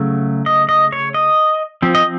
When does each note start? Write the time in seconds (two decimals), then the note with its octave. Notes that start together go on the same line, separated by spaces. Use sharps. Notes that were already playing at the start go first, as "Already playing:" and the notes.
Already playing: C#3 F#3 A3
0.46 D#5
0.69 D#5
0.92 C#5
1.14 D#5
1.82 F3 C4
1.95 D#5